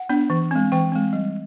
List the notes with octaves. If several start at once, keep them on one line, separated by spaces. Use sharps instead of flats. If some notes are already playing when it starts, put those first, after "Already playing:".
Already playing: F#5
B3 D4
E3
G#3 C4
E3 G5
G#3 C4
G3